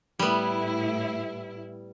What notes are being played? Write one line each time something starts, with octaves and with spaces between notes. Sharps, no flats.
A2 G3 B3 E4